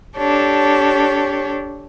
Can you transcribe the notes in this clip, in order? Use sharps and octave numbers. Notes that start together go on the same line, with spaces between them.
D4 G4 A4 C#5